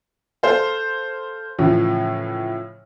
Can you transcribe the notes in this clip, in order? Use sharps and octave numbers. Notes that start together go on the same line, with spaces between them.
A4 C5 F5
A2 C#3 E3 F3